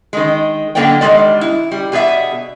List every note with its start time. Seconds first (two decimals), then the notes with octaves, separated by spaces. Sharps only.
0.13 D#3 G#3
0.75 D3 F#3 A#3 A4 D5 G5
1.01 B2 D#3 G3 G#3 D5
1.41 E4
1.71 G3
1.92 B2 G#4 D5 E5